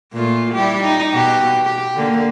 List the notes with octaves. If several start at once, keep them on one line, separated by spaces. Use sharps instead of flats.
A#2 A3 F4
G3 E4 G4
D#4
B2 G4
G4
D3 A#3